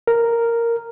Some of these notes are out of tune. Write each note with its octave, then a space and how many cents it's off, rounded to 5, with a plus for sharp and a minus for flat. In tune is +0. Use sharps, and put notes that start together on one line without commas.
A#4 -5